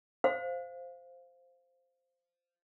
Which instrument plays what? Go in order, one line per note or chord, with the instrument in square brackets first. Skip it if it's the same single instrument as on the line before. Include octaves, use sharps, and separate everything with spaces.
[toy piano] C5 F5